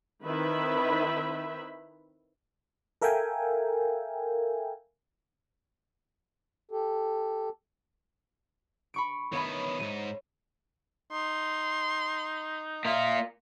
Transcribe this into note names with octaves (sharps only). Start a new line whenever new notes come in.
D#3 C4 E4 B4 E5 B5
A4 A#4 E5 F5 G5 G#5
G4 A4
B5 C#6 D7
D#3 B3 C#5 E5 B5
C#2 G#2 D#7
D#4 C6
A#3 F4 D#5 E5